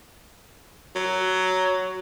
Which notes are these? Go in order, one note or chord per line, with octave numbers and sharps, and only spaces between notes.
F#3